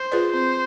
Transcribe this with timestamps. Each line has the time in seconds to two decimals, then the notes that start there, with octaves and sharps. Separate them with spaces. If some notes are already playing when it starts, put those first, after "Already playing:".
Already playing: C5
0.12 F4 G#4 B4 D5
0.33 C4 C5